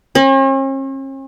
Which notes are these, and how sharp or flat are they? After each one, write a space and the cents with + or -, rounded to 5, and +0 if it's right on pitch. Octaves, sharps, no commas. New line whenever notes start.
C#4 -45